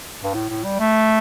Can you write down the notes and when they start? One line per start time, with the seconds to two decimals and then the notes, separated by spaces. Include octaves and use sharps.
0.24 G2
0.34 A2
0.49 A2
0.64 G3
0.79 A3